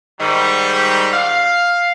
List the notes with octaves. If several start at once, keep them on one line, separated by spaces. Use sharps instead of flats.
G#2 D#3 G3
F5